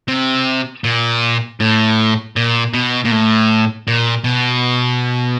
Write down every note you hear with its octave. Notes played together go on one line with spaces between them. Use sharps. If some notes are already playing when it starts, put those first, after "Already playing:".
C3
A#2
A2
A#2
B2
A#2
A2
A#2
B2